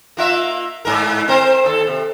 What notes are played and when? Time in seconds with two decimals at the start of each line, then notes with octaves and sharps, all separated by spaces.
0.17 A#3 F4 E5
0.85 G#2 A#4
1.28 C4 A#4 C5
1.65 D#2 A4
1.87 C3